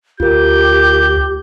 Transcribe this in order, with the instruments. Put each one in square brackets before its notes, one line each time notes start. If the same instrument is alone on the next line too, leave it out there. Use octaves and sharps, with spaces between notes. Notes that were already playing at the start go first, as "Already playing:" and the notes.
[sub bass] D2 [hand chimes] F4 A#4 [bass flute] G4 [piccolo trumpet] G6